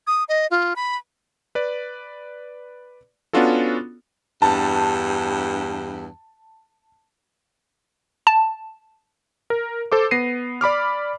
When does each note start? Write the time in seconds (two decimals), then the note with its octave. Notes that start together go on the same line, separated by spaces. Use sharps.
0.07 D#6
0.29 D#5
0.51 F4
0.76 B5
1.55 B4 D5
3.33 B3 C#4 D4 F4 F#4 A4
4.42 E2 G2 A5
8.27 A5
9.50 A#4
9.92 A4 C5 D6
10.11 B3 A#6 C7 D#7
10.61 D5 B5 D6 F6